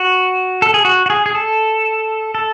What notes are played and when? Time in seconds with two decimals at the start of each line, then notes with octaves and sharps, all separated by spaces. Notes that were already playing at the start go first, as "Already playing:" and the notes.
Already playing: F#4
0.62 A4
0.74 G#4
0.85 F#4
1.06 F#4
1.10 G#4
1.26 G#4
1.35 A4
2.35 A4